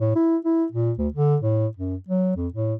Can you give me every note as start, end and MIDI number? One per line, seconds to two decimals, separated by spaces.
0.01 0.12 45
0.16 0.37 64
0.45 0.65 64
0.72 0.93 46
0.99 1.08 38
1.14 1.36 50
1.42 1.67 45
1.77 1.96 42
2.08 2.34 54
2.36 2.48 41
2.54 2.74 45